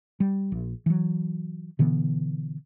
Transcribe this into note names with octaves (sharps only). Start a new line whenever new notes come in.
G3
A#1
E3 F#3
B2 D3 E3 B3